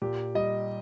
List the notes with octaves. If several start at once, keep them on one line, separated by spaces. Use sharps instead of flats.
A#2 G4
G3 D#5